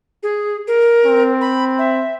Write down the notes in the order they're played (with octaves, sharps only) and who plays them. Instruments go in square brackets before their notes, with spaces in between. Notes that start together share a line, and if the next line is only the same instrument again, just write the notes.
[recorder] G#4
A#4
[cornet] C4
[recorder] B5
E5